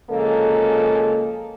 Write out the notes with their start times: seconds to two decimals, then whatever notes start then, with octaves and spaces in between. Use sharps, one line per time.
0.11 C#3 F3 G#3 A#3 A4